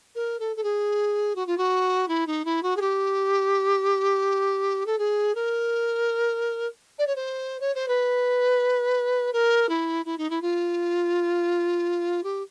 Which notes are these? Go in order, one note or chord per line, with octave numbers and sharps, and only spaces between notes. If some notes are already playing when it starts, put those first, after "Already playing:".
A#4
A4
A4
G#4
F#4
F4
F#4
E4
D#4
E4
F#4
G#4
G4
A4
G#4
A#4
D5
C#5
C5
C#5
C5
B4
A#4
E4
E4
D#4
E4
F4
G4